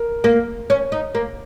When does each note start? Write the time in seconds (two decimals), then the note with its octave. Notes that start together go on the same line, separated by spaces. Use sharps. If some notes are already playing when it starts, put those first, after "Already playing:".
Already playing: A#4
0.24 A#3
0.70 C#4
0.92 D#4
1.15 A#3